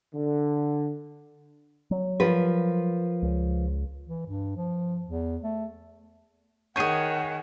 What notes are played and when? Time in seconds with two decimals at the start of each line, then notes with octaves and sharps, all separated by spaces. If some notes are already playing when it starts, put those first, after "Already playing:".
0.13 D3
1.91 F#3
2.20 F3 A#4 B4
3.22 C#2
4.07 E3
4.27 G2
4.56 F3
5.06 E2
5.43 A3
6.76 D#3 G#4 C#5 F#5 G6 D#7